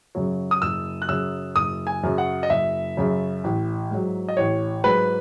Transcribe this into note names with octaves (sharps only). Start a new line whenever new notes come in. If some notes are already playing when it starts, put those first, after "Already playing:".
F#2 C#3 F#3
D#6
F#1 E6
F#6
F#2 C#3 F#3 E6
F#1 D#6
G#5
F#2 C#3 F#3
F#5
D#5
F#1 E5
F#2 C#3 F#3
A1
G#2 F#3
D#5
A1 C#5
G#2 F#3 B4